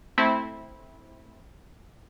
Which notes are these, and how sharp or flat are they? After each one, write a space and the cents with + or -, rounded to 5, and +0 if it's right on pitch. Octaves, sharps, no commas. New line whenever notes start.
A3 +0 C4 +0 E4 -15